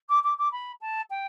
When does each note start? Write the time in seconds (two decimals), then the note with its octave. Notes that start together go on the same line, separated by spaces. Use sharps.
0.09 D6
0.23 D6
0.38 D6
0.52 B5
0.81 A5
1.10 G5